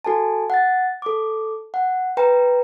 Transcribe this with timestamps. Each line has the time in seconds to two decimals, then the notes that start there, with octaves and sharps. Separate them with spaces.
0.05 F#4 A4 G#5 A5
0.50 F#5 A6
1.02 A4 D6
1.74 F#5
2.17 B4 G5 A#5